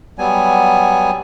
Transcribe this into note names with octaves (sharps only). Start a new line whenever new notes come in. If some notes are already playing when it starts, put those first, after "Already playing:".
F#3 G3 B3 G#5